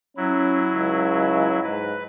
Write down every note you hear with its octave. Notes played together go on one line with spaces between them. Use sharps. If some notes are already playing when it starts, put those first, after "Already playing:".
F#3 C#4 E4
C#2
G#2 B4